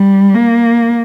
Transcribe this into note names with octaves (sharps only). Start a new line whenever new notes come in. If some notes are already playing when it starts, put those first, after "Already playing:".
Already playing: G3
A#3